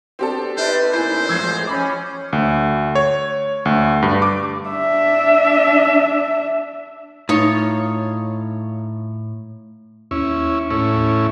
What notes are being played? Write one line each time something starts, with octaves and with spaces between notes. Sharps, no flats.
B3 C4 D4 G4 A4
D#4 B4 C5 D5
C#2 A#2 B3 E4 C5 G#5
G#1 A2 E3 F3 G#3 E6 G#6 C7
C#4 B5 D6
D2
C#5
D2
G2
D6
D4 E5
A2 D#4 F4 C#5
D#2 C#4 E4
A2 C#4 E4